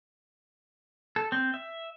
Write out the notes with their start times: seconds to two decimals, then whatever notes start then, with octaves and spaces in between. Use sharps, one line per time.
1.16 A4
1.32 C4
1.54 E5